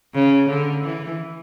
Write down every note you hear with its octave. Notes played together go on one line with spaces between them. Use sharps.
C#3
D3
E3